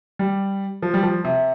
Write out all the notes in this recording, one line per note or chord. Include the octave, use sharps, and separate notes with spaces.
G3
F3
G3
F3
C3